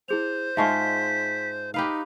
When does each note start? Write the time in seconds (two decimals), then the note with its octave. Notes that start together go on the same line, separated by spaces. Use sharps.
0.08 E4 G#4 C5 F7
0.57 G#2 G#3 F4 E5 A5 C#6 B6
1.74 D#4 G4 B4 F5